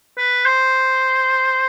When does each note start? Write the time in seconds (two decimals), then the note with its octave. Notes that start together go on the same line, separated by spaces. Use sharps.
0.18 B4
0.46 C5